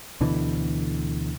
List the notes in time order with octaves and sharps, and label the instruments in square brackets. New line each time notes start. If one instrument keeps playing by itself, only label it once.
[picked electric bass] D2 B2 D3 E3